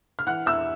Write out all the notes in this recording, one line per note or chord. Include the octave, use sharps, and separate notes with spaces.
F6
E3 F#5 F#6
E2 E5 E6